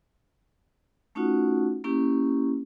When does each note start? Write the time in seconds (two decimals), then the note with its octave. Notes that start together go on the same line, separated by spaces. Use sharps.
1.15 A3 C#4 D#4 F4 F#4 F#5
1.84 A#3 C#4 E4 G4